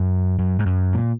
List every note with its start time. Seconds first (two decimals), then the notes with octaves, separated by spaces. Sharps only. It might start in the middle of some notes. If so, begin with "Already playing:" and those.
Already playing: F#2
0.39 F#2
0.59 G#2
0.66 F#2
0.93 A#2